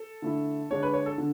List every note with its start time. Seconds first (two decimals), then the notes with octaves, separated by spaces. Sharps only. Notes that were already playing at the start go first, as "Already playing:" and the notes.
Already playing: A4
0.22 D3 A3 E4
0.70 D3 G#3 D4 C#5
0.83 B4
0.93 C#5
1.06 A4
1.18 D3